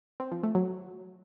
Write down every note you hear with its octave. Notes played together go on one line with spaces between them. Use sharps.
C4
F3
A3
F#3